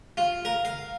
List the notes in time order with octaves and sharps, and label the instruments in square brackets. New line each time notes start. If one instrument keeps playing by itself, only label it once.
[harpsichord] F4
A#4
F5